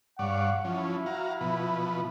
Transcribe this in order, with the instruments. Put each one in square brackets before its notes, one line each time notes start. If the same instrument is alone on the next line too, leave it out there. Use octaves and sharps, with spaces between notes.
[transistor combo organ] G2 C#5 D5 [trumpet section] F5 F#5
[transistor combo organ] F3 C#4 [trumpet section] E4
[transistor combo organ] F#4 F5 A#5
B2 F3 B4